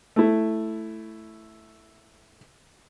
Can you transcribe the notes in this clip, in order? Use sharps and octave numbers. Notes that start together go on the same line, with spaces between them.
A3 E4